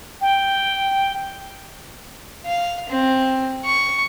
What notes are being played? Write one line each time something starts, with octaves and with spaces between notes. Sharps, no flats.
G5
F5
C4
C#6